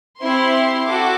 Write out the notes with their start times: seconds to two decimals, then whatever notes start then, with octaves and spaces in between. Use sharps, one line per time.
0.20 C4 E4 G4 C6
0.86 F#4 A4 D6